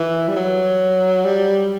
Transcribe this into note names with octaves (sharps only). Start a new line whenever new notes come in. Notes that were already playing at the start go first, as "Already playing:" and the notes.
Already playing: E3
G3
F#3
G3